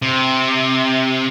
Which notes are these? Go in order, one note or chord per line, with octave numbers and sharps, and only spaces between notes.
C3